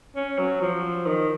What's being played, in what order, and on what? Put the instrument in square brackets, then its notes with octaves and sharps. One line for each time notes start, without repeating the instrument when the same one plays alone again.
[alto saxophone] C#4
F#3
F3
D#3